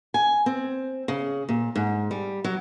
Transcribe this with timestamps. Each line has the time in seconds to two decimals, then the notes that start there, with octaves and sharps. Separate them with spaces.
0.14 G#5
0.46 C4
1.08 C#3
1.49 A#2
1.76 G#2
2.11 G3
2.44 F#3